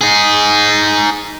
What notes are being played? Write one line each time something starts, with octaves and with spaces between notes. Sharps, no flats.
D#4 G#4